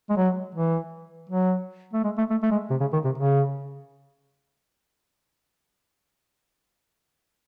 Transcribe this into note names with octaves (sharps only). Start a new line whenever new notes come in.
G#3
F#3
E3
F#3
A3
G#3
A3
A3
A3
G#3
C3
C#3
D#3
C3
C#3